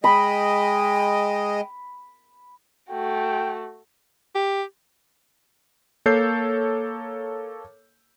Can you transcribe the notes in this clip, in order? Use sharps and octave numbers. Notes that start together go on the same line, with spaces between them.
G#3 D#5 G5 B5
A3 F#4 G5
G4
A#3 A4 C#5 G6 C7